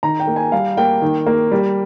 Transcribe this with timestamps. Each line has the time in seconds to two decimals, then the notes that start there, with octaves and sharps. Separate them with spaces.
0.03 D#3 A#5
0.20 G5
0.27 A#3
0.36 G#5
0.52 G3 F5
0.77 A#3 G5
1.02 D#3
1.27 A#3
1.52 G3